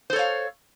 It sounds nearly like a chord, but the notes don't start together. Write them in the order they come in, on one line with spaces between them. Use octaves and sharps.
C5 A4 C#5 F5